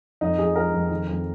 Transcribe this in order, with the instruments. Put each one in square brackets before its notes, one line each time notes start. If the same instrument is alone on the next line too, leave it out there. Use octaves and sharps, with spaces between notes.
[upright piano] F2 D#4
F3 G#4
F3 A#4
F2
D#3
F2